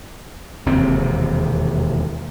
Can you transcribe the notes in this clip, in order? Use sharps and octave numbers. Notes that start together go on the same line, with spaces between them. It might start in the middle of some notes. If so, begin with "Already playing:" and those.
E1 D#2 C3 C4